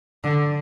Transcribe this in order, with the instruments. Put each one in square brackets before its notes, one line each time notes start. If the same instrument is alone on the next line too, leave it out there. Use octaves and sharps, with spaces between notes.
[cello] D3